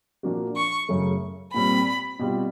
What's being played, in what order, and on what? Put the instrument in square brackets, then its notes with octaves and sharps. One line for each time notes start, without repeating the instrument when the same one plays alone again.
[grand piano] A#2 F3 A#3 D4 F#4
[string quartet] C#6
[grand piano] F#2 C#3 F#3 A3
[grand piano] A#2 G3 C4 [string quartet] B5
[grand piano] B2 G3 C4 F4